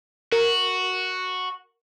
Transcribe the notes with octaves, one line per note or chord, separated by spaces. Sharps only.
F#4 A#4